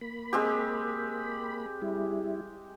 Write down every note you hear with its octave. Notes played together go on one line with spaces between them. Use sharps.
A#3 B5
G#3 C4 G4
G3 E4